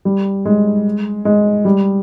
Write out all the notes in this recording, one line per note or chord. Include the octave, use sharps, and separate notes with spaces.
G3
G#3
G#3
G3